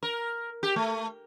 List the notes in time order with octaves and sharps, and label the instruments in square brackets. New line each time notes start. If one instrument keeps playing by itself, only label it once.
[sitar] A#4
G4
A3